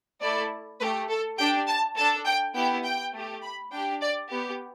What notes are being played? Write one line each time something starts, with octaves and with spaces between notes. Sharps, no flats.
A3 E4 A4 D5
A3 G4 B4
A4
D4 G4 G5
A5
D4 A4 A5
G5
B3 E4 G4 G5
G5
A3 G4
B5
D4 G4 G5
D5
B3 G4